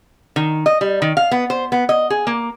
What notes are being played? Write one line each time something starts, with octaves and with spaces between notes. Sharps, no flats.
D#3
D#5
G3
D#3
F5
B3
C5
B3
D#5
G#4
A#3